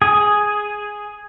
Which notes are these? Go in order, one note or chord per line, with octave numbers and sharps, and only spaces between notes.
G#4